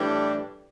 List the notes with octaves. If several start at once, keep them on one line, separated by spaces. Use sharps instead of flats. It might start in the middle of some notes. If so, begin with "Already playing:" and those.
Already playing: A2 E3 G3 D4 G4